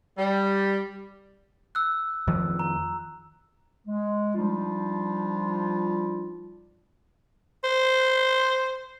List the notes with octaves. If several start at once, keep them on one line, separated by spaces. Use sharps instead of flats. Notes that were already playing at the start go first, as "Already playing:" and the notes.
G3
E6 F#6
F2 D#3 F3
A#5
G#3
F3 G3 D4 D#4 F4
C5